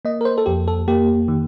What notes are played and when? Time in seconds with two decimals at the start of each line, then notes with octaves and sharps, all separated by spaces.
0.05 A#3 D#5
0.21 A#4
0.25 C5
0.38 A4
0.46 F2 G4
0.68 A4
0.88 A#3 G4
1.28 D#3